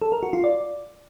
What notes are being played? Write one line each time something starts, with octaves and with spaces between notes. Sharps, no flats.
A4
A#4
F#4
F4
D5